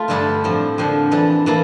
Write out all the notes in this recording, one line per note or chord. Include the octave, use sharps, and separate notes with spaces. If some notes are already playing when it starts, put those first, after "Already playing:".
Already playing: A3 F4
G2 D3 G3 D4 A4
A2 F3 C4
F2 D3 F3
E3 G3 D4 A4
E3 A#3 E4 A4